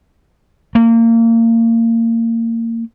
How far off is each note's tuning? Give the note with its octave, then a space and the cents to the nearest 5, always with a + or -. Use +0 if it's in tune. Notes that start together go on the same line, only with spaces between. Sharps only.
A#3 -30